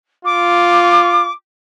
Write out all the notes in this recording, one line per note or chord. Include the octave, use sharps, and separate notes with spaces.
F4 D6